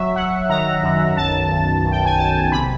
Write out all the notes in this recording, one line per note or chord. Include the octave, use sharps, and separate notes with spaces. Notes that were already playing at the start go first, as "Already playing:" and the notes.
Already playing: F#3 E5
F#3 F#5
D#3 A#5
F#2
B1 A5
B1
B1
G5
G#5
B1 A5
C3 B5